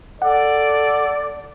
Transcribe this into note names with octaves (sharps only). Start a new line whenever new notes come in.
A4 D5 F#5